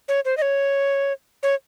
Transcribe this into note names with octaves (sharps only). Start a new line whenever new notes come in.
C#5
C5
D#5
C#5
C#5